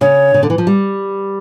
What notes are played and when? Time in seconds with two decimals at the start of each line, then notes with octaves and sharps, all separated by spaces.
0.01 C#3 C#5
0.34 C#3
0.43 D3
0.50 E3
0.58 F3
0.67 G3